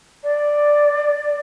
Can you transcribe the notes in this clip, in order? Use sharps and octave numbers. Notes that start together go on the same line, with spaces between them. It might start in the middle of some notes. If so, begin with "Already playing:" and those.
D5